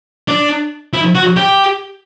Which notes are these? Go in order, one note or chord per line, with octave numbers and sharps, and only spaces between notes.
D4
E4
F#4
G4